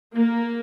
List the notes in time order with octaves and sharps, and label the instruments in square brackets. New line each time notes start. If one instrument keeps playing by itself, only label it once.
[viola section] A#3